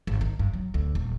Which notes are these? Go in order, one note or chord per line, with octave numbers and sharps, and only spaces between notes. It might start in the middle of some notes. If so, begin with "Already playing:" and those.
G#1
D#3
G2
F#3
D2
D#1